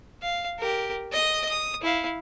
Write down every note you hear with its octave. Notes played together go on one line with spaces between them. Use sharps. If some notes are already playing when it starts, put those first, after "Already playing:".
F5
G4 A#4
D#5 D#6
D#6
E4 F5